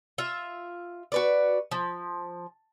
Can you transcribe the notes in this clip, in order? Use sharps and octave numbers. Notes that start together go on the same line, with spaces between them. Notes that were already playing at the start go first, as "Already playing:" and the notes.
F4 E5
F#4 B4 D5
F3